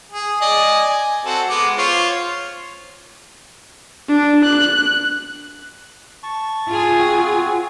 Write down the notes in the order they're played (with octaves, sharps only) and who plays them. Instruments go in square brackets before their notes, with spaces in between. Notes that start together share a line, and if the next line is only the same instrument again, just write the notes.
[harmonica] G#4
D5 D#5 G#5
G#5
C4 F#4 A4
G#3 B3 D6
F4 C5 C#5
[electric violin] D4
F#6
[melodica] A5 C#6
[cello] F4 G#4
[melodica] C4 F#4